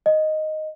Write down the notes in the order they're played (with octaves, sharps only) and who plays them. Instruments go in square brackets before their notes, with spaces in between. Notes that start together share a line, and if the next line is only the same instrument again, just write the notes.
[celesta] D#5